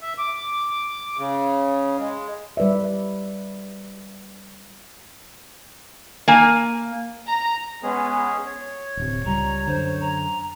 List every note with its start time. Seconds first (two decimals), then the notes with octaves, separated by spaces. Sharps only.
0.01 E5
0.18 D6
1.17 C#3
1.99 G#3
2.57 G3 B4 D5 E5
6.28 A#3 G#5
7.27 A#5
7.83 G#3 B3 C#4 G#4
8.46 C#5
8.97 D1 C3
9.25 C#2 G3 A#5
9.67 F#2 D3 C5
10.01 A#5